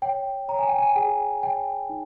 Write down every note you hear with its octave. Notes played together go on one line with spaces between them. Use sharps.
C#5 G5
C#5 A#5
G#5
G5
G#5
G#4 G5
C#5 G5
D#4